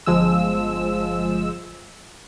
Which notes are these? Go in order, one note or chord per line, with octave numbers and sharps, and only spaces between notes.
G1 F3 G#3 E6